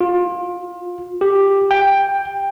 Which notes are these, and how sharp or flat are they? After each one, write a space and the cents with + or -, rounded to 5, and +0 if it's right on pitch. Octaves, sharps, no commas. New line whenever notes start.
F4 +20
G4 +10
G5 +10